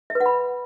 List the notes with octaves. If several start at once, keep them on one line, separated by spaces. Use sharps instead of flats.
E5
B4
F#5
B5